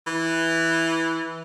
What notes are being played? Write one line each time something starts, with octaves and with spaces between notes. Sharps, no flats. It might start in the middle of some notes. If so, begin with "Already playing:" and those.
E3